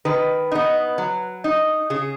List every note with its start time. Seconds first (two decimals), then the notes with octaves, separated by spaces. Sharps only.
0.05 D#3 B4
0.52 B3 D#4
0.98 F#3
1.44 D#4
1.90 C#3 G#4